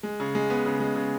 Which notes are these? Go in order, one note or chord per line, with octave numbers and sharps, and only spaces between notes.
G#3
C#3
G#3
B3
C#3
G#3
C#3